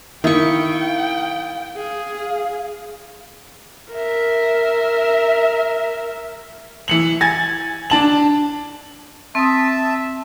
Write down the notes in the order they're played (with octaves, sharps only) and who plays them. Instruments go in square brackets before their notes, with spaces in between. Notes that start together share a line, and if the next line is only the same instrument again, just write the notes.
[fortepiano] D#3 [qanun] E4 C#6 [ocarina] F5 [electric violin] G5
[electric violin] G#4 [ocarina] F5
[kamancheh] A#4 E5
[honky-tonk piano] E3 C#7 F#7
G#5 G#6 A6
D4 A5 F#7
[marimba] C4 D#6 [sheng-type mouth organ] E5 A5